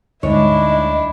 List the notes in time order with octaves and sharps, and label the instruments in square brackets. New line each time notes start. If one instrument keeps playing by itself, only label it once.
[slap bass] D2 D3 G3 [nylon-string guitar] G#2 C#5 [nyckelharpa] D4 E4 [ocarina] D#5